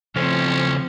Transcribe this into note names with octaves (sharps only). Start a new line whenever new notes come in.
C#3 F3 C4 C#4 A4 C5